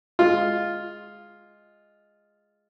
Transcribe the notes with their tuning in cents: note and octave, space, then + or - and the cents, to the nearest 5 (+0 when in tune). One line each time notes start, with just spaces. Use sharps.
G#3 +0 F4 +0